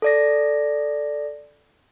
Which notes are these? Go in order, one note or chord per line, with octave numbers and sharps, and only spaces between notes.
A4 D5 A#6